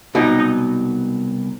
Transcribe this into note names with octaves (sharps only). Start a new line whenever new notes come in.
C2 B2 F#3 D#4